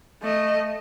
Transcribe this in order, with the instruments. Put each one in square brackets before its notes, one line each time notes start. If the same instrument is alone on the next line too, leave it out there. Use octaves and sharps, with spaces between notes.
[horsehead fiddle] A3 D#5